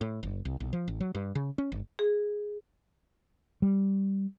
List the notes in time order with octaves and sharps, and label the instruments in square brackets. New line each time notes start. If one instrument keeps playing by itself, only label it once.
[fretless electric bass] A2
F#1
C2
B1
F3
A1
F#3
G2
C#3
C#4
G1
[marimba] G#4
[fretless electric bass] G3